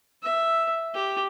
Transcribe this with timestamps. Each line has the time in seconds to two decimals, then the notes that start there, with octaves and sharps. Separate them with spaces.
0.23 E5
0.94 G4